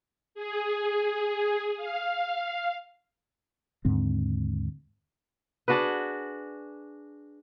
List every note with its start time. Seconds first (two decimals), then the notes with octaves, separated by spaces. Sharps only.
0.35 G#4
1.77 F5
3.85 D#2 G#2 D3 C4
5.68 D4 F#4 G#4 B4